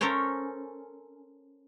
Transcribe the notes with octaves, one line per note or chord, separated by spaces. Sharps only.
C#4 A4 A#4 C5 C#5